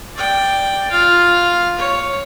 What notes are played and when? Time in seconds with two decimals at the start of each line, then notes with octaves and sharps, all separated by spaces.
0.16 D5 G5
0.90 F4 F5
1.78 C#5